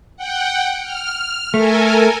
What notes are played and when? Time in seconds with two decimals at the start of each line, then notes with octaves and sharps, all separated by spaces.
0.17 F#5 G5
0.82 F6
1.54 A3 A4 A#4 G#5